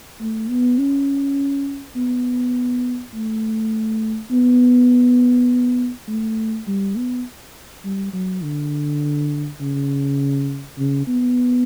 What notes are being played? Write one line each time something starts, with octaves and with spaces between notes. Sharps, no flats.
A3
B3
C#4
B3
A3
B3
A3
G3
B3
G3
F#3
D3
C#3
C#3
B3